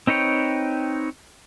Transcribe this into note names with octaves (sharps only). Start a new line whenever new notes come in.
C4 D#4 B4 C#5 G5